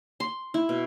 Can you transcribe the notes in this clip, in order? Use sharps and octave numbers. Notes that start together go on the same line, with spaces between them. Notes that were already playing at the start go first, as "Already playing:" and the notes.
C6
E4
B2